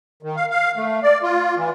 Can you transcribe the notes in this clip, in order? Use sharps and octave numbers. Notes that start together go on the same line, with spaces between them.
D#3
F5
F5
A3
D5
F4
E3